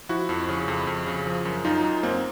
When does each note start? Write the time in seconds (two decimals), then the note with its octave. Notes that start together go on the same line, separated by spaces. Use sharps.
0.09 F3 E4 F#4
0.29 F2
0.49 C#3
0.68 F2
0.87 F2
1.07 C#3
1.26 F3
1.45 F#2
1.64 F#2 D#4 F4
1.84 F#2
2.03 F#2 A#3 C4